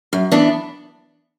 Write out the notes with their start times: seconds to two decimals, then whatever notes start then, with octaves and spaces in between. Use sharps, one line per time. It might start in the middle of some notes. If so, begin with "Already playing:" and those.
0.13 F#2
0.32 E3 B3 D4